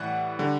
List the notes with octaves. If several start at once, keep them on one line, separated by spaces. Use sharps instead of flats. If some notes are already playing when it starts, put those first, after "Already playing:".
Already playing: A2 E3 G3 F#5
D3 G3